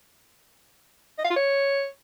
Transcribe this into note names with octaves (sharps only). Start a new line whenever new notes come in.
D#5
F5
F4
C#5